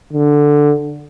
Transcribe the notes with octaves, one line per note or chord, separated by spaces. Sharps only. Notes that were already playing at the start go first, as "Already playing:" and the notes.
D3